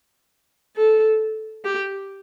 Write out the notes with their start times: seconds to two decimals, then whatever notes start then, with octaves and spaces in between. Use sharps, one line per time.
0.76 A4
1.64 G4